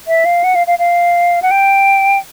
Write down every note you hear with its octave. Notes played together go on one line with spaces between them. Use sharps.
E5
F5
F#5
F5
F5
F5
F#5
G5